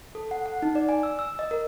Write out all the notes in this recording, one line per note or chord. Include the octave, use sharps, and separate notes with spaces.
A4
F#5
F#5
D#4
D5
G#5
E6
E6
D#5
A#4